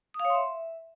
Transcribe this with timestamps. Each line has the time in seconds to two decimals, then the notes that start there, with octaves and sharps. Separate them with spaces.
0.14 D#6
0.20 F5
0.25 C#5
0.30 C6
0.35 E5